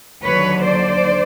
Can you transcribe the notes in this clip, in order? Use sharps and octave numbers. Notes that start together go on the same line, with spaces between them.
D#2 D3 F#3 B4 C#5
C5 D5